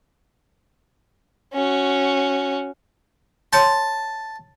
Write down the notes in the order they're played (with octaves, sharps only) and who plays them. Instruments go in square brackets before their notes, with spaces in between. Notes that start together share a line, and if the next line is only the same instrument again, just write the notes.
[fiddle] C#4 F#4
[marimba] C#5 C6 G6 [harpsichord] A5